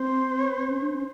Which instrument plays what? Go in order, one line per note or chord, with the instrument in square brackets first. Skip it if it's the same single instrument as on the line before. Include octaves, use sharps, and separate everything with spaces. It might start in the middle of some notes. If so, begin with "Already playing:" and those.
Already playing: [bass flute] C4 [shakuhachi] C5
[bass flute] C4
C#4
D4
C#4